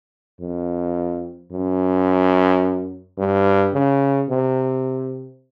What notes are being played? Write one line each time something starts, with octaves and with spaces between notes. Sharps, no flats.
F2
F#2
G2
C#3
C3